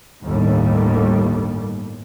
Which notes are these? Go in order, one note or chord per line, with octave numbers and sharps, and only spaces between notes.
G1 D#2 A2 G3